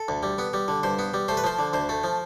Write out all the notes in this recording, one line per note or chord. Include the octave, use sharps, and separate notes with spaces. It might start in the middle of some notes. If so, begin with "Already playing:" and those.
Already playing: A4
D2
G3
B3
G3
D3
G2 C5
B3
G3
A3 C5
B4
F3 C5
D3
D2 C5
A3
F3